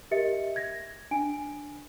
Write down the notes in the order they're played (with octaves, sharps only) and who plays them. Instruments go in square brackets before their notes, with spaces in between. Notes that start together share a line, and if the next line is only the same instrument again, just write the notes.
[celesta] G4 A#4 D#5 E5 A6 C#7
G#6 A#6
D4 G#5 D7